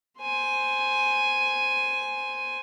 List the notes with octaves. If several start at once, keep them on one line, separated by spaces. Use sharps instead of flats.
C5 G#5